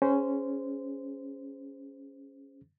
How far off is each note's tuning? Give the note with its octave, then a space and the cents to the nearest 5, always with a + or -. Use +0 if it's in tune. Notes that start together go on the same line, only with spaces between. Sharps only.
C#4 +0 G#4 +0 C5 -20